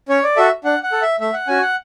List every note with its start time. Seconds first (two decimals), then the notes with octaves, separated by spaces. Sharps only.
0.09 C#4 C#5
0.24 D5
0.36 F#4 A4 E5
0.65 D4 F#5
0.83 F#5
0.92 A4
1.02 E5
1.20 A3 E5
1.33 F#5
1.47 C#4 F#4 G#5
1.61 F#5